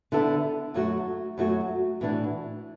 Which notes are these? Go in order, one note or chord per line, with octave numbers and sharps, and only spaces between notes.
D3 B3 E4 A4
F#2 F#3 A3 F#4
F#2 F#3 A3 F#4
A2 E3 D4 F#4